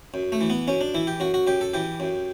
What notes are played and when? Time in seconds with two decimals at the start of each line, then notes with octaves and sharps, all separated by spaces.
0.14 F#2
0.32 A3
0.41 E3
0.50 B3
0.68 F#2 C#4
0.81 D4
0.95 E3 E4
1.07 G4
1.20 F#2 F#4
1.34 F#4
1.47 F#2 G4
1.61 A4
1.74 E3 G4
2.00 F#2